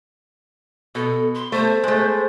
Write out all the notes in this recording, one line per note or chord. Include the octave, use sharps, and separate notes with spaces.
B2 A4
C6
A3 C5
G#3 A3